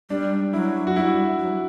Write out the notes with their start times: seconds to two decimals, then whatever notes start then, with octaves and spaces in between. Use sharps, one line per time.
0.10 G3 D4
0.53 F#3 E4
0.87 F#4
0.96 G3 E4
1.39 F#3